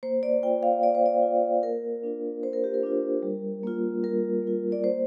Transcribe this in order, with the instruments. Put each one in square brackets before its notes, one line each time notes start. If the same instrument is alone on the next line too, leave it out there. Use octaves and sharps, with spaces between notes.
[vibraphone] A#3 C5
D5
F4 G5
F5
A#3 D5
C5
D5
F4
A#3 A#4
D4 F4
A#3 C5
A#4
G4
A#4
D4 F4
G3
A#3 F4
G3 A#4
A#3 F4
D5
A#3 C5